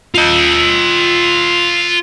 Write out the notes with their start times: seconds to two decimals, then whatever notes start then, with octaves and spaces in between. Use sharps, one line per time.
0.15 F4 D#5